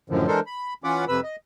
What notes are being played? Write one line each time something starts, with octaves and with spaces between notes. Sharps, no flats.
F#2 A2 D3 D#3 F3
E3 G#3 D4 A4 A#4 C5
B5
E3 C#4 F4 F#5 B5 D6
F2 C3 B4 B5 E6
D#5